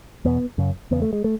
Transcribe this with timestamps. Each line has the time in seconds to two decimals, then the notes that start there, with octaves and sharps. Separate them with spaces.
0.25 E2 B2 B3
0.58 F#2 C#3
0.91 E2 C#3 B3
1.02 A3
1.13 G#3
1.24 A3